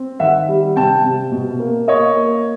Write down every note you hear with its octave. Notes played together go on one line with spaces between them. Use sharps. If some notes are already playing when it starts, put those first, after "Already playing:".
Already playing: C4
D#3 E5 F#5
G3
C3 G5 A5
C3
B2
A#3
A#3 C#5 D#5
A#3